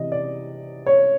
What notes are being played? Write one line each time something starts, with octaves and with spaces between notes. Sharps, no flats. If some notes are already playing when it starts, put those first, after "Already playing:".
Already playing: C3 E3 D#5
D5
C#5